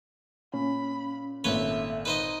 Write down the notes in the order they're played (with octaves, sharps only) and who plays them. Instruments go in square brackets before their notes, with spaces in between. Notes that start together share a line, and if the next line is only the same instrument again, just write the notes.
[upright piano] A#2 [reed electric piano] C#4 [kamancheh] B5
[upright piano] G#1 A#2 G7 [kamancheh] A4 E5 [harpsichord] B4 C#5
[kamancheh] D#4 [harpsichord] B4 C5 D#5